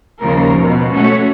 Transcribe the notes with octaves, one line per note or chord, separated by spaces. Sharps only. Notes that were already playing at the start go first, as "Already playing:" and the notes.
D#2 C#3 F3 A#4
B2
A3 C#4 F#4